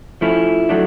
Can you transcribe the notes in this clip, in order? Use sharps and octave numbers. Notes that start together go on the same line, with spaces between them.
F3 A3 C#4 E4
F#3 A3 D4